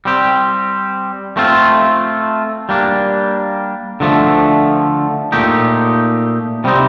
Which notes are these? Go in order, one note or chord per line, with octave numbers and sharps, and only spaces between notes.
G3 C4 G4
A3 C4 F4
G3 A#3 D4
D3 F3 A3
A#2 A3 D#4 G4
C3 G3 C4 D#4